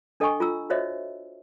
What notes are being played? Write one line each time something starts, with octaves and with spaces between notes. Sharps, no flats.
D4 A4 D#5 G5 G#5 C#6
F4 A#5 E6
F#4 C5 C#5 D#5 E5